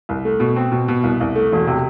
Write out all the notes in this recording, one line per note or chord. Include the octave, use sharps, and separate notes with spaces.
C2
A3
B2
C4
B2
B2
C2
C2
A3
E1
C3